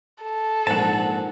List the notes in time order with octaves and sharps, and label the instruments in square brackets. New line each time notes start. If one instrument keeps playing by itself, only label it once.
[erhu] A4
[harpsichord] A#1 G#2 [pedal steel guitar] F#5 A5